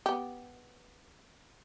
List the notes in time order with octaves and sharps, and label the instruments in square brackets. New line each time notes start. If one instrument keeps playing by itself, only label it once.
[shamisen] B3 G4